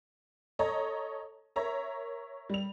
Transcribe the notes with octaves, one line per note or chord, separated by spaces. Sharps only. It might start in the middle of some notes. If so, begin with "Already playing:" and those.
A4 C#5 D#5 A#5
A#4 C#5 E5 A#5
G3 F7